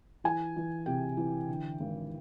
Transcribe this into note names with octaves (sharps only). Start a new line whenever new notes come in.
E3 G#5
E3
C3 G5
E3
D3
G#1